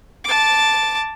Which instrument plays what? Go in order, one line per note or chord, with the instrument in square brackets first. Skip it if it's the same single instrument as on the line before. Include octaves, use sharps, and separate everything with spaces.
[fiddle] A5 D6